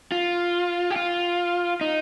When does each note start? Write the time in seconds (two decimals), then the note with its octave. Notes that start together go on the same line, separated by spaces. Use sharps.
0.12 F4
0.90 G4
0.96 F4
1.81 D#4